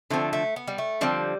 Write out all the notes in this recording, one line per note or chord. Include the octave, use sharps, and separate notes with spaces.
D3 F3 A3 C4
A3
B3
G3
A3
D3 F3 G3 C4